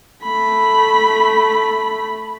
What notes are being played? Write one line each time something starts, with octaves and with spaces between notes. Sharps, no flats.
A3 B5